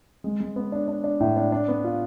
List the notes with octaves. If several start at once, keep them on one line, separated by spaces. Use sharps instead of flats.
G#3
G#3
B3
D4
D4
D4
A2
D4
D4
B3
F4